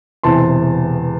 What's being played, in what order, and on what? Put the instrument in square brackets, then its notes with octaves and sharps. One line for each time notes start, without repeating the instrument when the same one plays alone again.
[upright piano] E1 E2 C3 E3 A5 C6